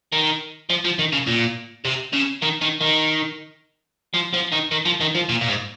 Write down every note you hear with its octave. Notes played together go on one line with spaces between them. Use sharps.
D#3
F3
F3
D#3
C#3
A#2
C3
C#3
D#3
D#3
D#3
F3
F3
D#3
D#3
F3
D#3
F3
A#2
A#2
G#2